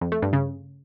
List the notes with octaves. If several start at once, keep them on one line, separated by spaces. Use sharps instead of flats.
F2
A3
G2
C#3